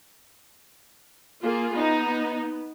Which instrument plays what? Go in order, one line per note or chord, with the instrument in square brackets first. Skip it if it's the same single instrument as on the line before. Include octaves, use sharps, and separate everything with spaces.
[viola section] A#3 F4 G#4
[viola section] B3 [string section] D#4